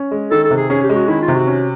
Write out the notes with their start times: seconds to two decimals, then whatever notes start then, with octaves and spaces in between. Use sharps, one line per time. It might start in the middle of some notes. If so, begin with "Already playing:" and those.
Already playing: C#4
0.11 G#3
0.31 D#3 A4
0.44 A4
0.51 C3
0.57 G#4
0.70 C#4 G#4
0.83 G4
0.89 G#3
0.95 F#4
1.08 D#3 E4
1.21 F4
1.28 C3
1.34 F#4
1.47 C#4